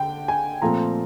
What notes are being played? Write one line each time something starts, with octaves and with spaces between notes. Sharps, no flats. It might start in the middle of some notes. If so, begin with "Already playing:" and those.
Already playing: D3 G5
G#5
A#2 F3 A3 C4 A#5